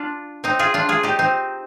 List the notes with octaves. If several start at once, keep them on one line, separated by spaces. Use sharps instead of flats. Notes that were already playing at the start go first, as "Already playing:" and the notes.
Already playing: D4 F4
C4 D#4
F4 G#4
D4 F4
F4 G#4
D#4 G4
C4 D#4